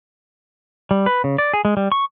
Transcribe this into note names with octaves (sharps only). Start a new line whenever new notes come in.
G3
B4
C#3
D5
G#4
G#3
G3
C#6